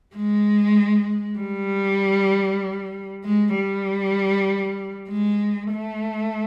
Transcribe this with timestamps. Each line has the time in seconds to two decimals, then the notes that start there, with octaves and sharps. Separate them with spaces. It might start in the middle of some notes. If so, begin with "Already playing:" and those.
0.15 G#3
1.39 G3
3.24 G#3
3.55 G3
5.08 G#3
5.71 A3